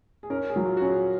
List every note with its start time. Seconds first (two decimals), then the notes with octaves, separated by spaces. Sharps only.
0.23 G#4
0.30 C#4 A#4
0.49 G#4
0.56 F#3
0.66 F4
0.77 C#4 F#4
0.88 G#4